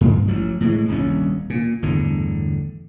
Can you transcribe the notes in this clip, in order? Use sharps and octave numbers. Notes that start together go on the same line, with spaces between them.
G2
A1 F3 F#3
A2 E3 G#3
D#1 C2 G2 C#4
A#2
G1 E2 A2 D3